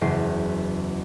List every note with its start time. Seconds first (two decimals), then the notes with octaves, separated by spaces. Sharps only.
0.01 F#1 E2 C7